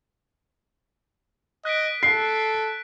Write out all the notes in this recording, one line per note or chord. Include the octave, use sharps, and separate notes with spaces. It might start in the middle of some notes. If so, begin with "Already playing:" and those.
D#5 F#6 B6 D7
A4 C7